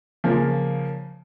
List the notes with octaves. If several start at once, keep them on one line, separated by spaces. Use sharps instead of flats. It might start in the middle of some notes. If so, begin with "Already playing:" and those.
C#3 F3 A#3